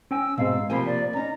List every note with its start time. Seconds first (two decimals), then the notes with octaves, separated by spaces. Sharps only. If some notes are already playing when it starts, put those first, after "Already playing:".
0.11 C#4 G5 G#5 E6
0.38 G#2 B2 C4 G#4 F5
0.70 C3 F3 A#3 G#5 B5
0.86 D5
1.13 C#4 D#4 A#5